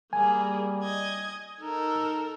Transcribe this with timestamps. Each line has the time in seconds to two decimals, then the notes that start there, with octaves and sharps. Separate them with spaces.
0.13 G3 A#3 G#4 G#5
0.83 D#5 G#6
1.60 D#4 A4 A#4